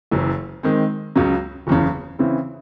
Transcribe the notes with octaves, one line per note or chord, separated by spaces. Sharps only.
F#1 F#2 E3
D#3 G#3 C4
C#2 C#3 F#3
F#1 E2 C#3
C#3 E3 C4 E4